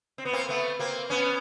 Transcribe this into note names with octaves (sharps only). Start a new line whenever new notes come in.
C4
B3
A#3 C4
A3 B3
A#3 C4
B3 C#4